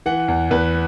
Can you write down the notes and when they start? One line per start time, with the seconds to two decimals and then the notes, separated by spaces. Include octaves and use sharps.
0.06 E3 F#5
0.28 E2
0.51 E2 B4